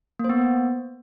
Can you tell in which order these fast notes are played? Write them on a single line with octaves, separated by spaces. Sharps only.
A#3 C5 B3